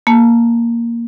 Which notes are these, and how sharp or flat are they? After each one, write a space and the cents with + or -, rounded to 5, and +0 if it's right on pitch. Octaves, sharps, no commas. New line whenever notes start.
A#3 +0 A5 -5